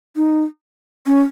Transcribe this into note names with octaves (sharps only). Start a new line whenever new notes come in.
D#4
C#4